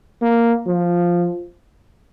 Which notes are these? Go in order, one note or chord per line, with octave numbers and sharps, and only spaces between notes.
A#3
F3